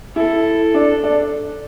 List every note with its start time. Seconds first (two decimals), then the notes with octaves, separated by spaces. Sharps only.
0.16 E4 A4
0.74 D4
1.04 D4